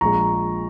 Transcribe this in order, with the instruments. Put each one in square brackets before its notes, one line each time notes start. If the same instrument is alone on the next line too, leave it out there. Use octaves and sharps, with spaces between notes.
[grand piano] A#1 A#2 G#3 A#5 C#6